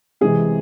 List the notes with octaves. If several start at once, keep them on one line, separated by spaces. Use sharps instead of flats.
C3 E3 G#3 C4 G#4